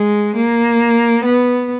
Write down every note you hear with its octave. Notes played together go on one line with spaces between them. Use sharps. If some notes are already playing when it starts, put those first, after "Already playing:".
Already playing: G#3
A#3
B3